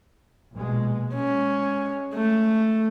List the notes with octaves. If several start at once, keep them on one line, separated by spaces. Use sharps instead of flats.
A#1 B2 G#3
G#3 C#4
A3